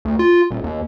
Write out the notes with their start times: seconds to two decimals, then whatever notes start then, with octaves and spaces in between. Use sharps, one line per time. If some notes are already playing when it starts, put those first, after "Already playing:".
0.05 D2
0.19 F4
0.51 D#1
0.64 D#2